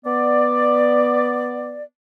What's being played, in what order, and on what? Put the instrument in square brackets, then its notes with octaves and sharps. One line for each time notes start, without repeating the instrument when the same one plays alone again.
[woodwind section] B3 D5